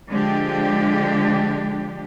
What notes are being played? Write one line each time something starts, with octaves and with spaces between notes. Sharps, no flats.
D3 F3 G#3 D4 G4